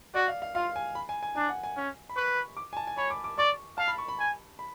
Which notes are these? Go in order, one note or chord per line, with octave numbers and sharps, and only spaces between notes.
F#4 D5
F5
F5
F4 F5
G#5
B5
G#5
G#5
D4 G#5
F#5
G#5
C#4
B5
B4 C#6
D6
G#5
A5
G#5
C#5 B5
D6
D6
D5 C#6
F5 A5
B5
C#6
B5
G#5
B5